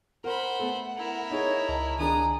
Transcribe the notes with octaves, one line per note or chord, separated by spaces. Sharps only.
A#4 C5 F#5 B5
A3 B3 A4
E4 A#4
D#4 G#4 C#5
C#2 D#5 A5 A#5
D#3 D4 G#4 G#5 A#5 D#6